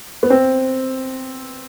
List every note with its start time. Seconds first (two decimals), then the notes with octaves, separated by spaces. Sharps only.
0.23 B3
0.30 C4